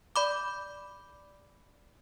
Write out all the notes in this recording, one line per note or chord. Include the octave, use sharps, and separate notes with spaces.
D5 B5 D6